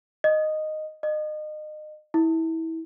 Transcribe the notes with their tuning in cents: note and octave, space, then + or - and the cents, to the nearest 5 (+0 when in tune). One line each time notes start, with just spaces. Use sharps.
D#5 -10
D#5 -30
E4 -25